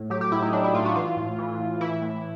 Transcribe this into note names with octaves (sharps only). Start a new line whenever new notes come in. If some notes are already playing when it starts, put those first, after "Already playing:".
Already playing: A2
F#3 G4
G4
A2 E4
D#4
F#3 D4
E4
A2 F4
F#4
E3 F4
A2
E3
A2
E3 E4
A2